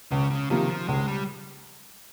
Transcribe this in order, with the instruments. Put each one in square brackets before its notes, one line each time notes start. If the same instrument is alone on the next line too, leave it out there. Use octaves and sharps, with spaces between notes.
[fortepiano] C#2 [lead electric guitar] C#3
[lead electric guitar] C#3
[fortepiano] C3 F3 A#3 [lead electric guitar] D#3
[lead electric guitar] F3
[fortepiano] C#2 [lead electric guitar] G#3
[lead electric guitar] G3